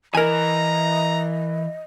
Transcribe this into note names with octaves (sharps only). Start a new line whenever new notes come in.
E3 A#4 D#5 G#5 A#5